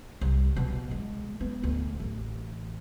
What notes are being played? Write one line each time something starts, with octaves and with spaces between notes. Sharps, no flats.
C2
B2
G#3
B3
D2
A1